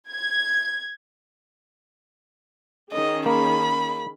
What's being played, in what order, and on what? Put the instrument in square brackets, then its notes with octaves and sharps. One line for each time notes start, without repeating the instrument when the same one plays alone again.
[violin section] G#6
[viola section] D#3 C#4 G#4 [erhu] D#5
[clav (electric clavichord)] A#3 [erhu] B5